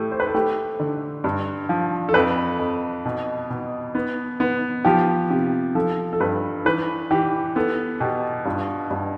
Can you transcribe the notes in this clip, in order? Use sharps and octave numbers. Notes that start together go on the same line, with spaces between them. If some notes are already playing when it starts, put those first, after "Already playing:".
Already playing: A2 A3 G4
C5
B4
A4
A3 G4
D3
G2
F3
A4
F2 B4
F2
B2
B2
B3
B3
F3 G4
C3 G4
F3 A4
A4
G2 B4
E3 B4
E3 G4
B3 A4
B2 G4
G2 F4
G2